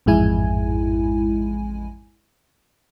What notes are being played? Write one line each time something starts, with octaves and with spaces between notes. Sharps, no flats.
A1 F2 G#2 G#3 E4 G#5